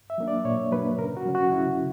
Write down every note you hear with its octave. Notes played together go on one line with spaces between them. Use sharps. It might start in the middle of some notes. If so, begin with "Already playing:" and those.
E5
F#3 A#3 D4
D5
A#2 C#5
F#3 A#3 D4 B4
C#3 A#4
F#4
F#3 C#4
F#4
C#3 E4